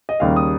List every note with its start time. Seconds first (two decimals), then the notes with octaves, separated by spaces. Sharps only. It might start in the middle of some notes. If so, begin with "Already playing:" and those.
0.09 D#5
0.20 D#2 C#3 G3 A#3 F5
0.36 D#6